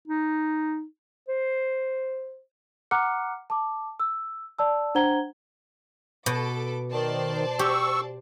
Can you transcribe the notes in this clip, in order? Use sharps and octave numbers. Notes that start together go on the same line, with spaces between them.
D#4
C5
F#5 A#5 D6 F6 F#6 C#7
A5 D6
E6
D5 A5 E6
D4 C5 F#5 A#5 G#6 G7
B2 A4 B4 D6
D#3 C5 D5 A5
G4 C#6 E6